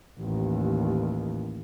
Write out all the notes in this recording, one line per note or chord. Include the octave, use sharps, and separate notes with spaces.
A1 D#2